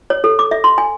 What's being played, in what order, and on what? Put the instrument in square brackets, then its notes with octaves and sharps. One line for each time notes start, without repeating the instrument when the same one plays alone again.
[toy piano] C#5
A4
D6
E5
C6
G#5